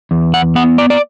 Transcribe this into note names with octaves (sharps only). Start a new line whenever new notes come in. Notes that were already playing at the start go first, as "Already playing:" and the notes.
E2
F#5
B3 F#5
D5
D5